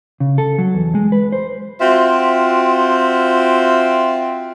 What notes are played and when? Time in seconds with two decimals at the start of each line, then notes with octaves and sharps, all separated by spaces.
0.20 C#3
0.38 A4
0.58 F#3
0.74 E2
0.95 G#3
1.12 B4
1.32 C5
1.80 C4 F4 F#4 E5